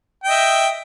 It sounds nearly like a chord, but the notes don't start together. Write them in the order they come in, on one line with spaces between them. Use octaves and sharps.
G5 D#5 E5